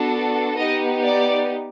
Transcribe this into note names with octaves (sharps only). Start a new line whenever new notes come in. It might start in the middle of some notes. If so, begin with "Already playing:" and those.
Already playing: B3 D4 F#4 A4
B3 D#4 G4 D#5
D5